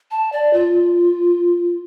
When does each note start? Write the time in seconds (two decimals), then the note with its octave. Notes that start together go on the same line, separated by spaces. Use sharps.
0.11 A5
0.32 D5
0.53 F4